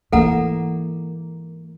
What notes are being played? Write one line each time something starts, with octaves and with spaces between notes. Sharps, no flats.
G#2 E3 A#3 A4 F#5 A#5